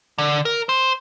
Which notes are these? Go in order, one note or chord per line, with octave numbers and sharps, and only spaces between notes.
D3
A#4
C5